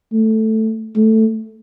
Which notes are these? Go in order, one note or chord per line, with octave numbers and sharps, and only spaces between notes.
A3
A3